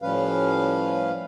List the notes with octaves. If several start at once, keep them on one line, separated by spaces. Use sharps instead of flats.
A2 F3 G3 C#4 B4 F5